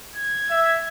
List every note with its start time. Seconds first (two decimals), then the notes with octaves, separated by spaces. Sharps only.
0.15 G#6
0.50 E5